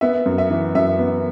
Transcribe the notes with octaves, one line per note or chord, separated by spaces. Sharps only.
B3 E5
F#2
E5
E3
F#2 E5
B3